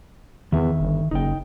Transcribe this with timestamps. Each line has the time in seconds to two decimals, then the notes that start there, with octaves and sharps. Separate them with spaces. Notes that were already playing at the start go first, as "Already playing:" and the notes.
0.52 E2 D#3 E5
0.81 G1
1.11 F#1 D#4 G5